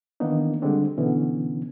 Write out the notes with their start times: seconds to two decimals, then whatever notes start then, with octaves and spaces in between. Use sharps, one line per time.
0.20 D#3 E3 A#3 B3 D4 D#4
0.62 D3 G3 G#3 C4 D4
0.98 B2 D3 E3 B3 C#4